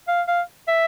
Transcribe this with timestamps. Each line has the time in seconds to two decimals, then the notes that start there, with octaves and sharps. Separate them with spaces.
0.08 F5
0.28 F5
0.68 E5